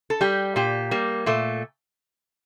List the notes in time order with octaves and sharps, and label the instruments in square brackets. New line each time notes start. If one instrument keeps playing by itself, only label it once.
[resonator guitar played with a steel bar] A4
G3 G4
A#2 G4
G3 A#3
A#2 A3